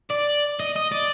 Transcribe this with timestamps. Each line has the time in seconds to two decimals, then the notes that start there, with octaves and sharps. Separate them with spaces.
0.11 D5
0.60 D#5
0.76 D#5
0.92 D5